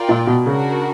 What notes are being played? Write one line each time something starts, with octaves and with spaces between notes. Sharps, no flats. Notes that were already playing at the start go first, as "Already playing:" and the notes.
Already playing: F4 A#4 D5 G5
A#2
B2
C#3 D4 F#4 A#4